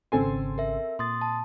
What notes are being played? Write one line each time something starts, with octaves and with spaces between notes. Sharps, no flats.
G#1 C#3 C4 A4 G#5 C6
A#4 E5
A#2 C6 D#6 A6
A5